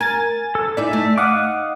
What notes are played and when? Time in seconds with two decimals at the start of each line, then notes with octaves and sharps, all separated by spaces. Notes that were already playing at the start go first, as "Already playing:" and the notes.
0.01 A#4 G#5 A6
0.55 A4
0.77 D#4 E4 D5 E5
0.93 A3
1.18 D#4 F5 F#5 D6 D#6